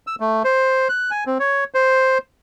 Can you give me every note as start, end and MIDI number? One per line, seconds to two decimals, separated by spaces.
0.07 0.16 88
0.20 0.43 57
0.44 0.88 72
0.89 1.11 90
1.11 1.24 80
1.26 1.38 60
1.40 1.64 73
1.74 2.18 72